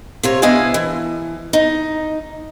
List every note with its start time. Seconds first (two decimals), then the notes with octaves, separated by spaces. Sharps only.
0.23 C3 F4 C#5
0.42 B3 D4 E4 D#5 F5 G#5
0.74 E3
1.53 D#4